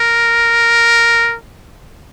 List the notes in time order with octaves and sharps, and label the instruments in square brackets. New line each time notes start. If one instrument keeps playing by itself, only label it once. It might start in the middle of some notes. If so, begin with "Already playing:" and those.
Already playing: [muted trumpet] A#4